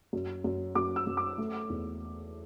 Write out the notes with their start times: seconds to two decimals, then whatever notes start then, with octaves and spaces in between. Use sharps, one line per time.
0.13 F#2
0.44 F#2
0.75 F#2 D6
0.96 E6
1.07 F#2
1.17 D6
1.38 A3
1.70 E2